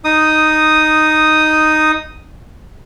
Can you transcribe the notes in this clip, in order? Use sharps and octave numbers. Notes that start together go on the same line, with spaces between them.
D#4 D#6